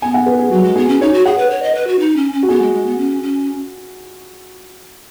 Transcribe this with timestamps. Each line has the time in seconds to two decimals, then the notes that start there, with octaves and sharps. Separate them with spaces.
0.02 B3 G#5
0.14 F#5
0.26 B4
0.39 G#4
0.51 F#3 F#4
0.63 G#3
0.76 B3 G#4
0.89 C#4
1.01 D#4 C#5
1.13 F#4
1.26 G#4 F#5
1.38 B4
1.50 C#5
1.63 D#5
1.75 B4
1.87 F#4
1.99 D#4
2.16 C#4
2.33 C#4
2.43 F#4
2.49 B3 G#4
2.61 G#3
2.74 G#3
2.86 B3
2.98 C#4
3.23 C#4